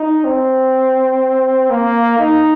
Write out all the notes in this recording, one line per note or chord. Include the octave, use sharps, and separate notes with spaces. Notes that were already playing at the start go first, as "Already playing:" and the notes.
Already playing: D#4
C4
A#3
D#4